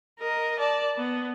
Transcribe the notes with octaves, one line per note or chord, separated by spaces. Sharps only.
A#4 D#5
D5 A5
B3